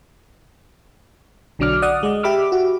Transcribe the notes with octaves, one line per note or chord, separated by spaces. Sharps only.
B1 D3 F#3 D4 D6 F6
D5 F#5 D#6
G#3 D5 D#5
G4 E5 B5 D6 E6 F6
F#4